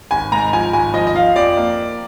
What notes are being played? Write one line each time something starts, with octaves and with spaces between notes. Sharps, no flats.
G#1 G#5
G#2 A#5
F3 G#5
G#1 G#5
F3 D#5
D#5
F3 F5
F2 D5
A#3